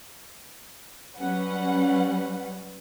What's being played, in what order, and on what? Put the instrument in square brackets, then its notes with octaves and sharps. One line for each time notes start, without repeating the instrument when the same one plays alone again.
[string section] F#3 G3 C#4 B4 F#5